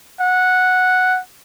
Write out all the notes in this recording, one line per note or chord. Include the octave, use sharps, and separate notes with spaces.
F#5